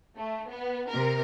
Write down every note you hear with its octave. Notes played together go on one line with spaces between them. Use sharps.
A3
B3
C3 A#4